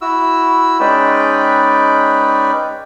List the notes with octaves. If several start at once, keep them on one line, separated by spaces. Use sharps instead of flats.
E4 F#4 E6
G#3 C#4 D#4 B4 D5 G5